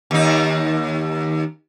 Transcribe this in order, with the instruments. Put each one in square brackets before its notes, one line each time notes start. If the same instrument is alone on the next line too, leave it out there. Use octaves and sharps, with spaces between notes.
[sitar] D#2 D#4